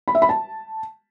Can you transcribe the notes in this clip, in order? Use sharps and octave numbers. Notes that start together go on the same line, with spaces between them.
B5
E5
B5
A5